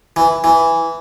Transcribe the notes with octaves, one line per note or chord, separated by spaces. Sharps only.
E3
E3